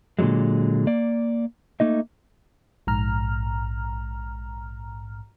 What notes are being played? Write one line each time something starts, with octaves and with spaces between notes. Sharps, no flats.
A#2 D3 F3 F#3 G#3
A#3 D5
A3 A#3 D#4 D#5
A#1 G#2 A#5 F6